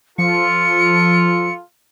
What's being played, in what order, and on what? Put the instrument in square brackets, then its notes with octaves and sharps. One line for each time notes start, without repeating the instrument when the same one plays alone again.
[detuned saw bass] F3 [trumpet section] F4 A4 [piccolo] C#7